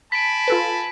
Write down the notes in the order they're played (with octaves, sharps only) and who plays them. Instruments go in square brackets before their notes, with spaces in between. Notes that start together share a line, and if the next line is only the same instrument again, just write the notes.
[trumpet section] G#5 A5 B5 [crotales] B6 D7
[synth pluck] F4 A4 B4